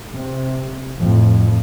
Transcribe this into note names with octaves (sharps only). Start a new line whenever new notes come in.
C3
F2 A2